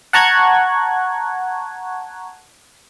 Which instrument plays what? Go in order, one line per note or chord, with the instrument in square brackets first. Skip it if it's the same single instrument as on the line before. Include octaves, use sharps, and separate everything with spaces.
[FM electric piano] F#5 A5 A#5 C#6 F#6 G#6